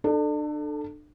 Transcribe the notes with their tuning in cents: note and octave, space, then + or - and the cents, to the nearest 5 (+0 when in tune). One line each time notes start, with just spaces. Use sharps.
D4 +35 A4 +0